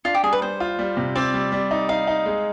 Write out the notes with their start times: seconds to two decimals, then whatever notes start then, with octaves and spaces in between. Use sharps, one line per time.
0.05 D4 F4
0.15 G4
0.23 G3 G#4
0.33 B4
0.42 G3 C5
0.60 F4
0.79 G3
0.97 C3
1.15 C4 D5
1.34 G3
1.52 G3
1.71 D#4
1.89 D#4 F5
2.07 D#4
2.26 G#3